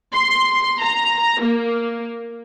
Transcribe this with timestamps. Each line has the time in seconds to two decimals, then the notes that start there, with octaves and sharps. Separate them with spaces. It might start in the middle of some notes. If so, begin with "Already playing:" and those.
0.12 C6
0.81 A#5
1.42 A#3